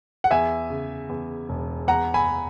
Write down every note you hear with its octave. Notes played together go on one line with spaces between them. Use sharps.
F#5
E2 E5 G#5
C#3
E2
E1
E2 F#5 A#5
G#5 B5